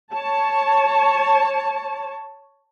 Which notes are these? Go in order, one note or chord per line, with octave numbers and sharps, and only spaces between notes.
C#5 A5